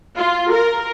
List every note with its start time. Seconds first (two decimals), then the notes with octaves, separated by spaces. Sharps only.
0.16 F4
0.53 A#4